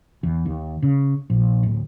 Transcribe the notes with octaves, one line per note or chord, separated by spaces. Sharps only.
E2
D#2
C#3
A#1
D1